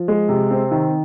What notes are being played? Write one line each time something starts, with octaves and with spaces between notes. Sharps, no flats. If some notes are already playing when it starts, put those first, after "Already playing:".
Already playing: F3
G#3
C3
C4
D#3